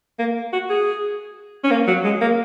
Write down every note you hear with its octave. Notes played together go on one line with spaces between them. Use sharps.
A#3
F#4
G#4
C#4
A#3
F#3
G#3
A#3